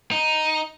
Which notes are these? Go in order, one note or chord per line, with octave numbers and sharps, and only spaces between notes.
D#4